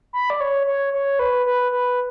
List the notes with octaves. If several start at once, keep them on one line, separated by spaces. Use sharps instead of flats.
B5
D5
C#5
C#5
C#5
B4
B4
B4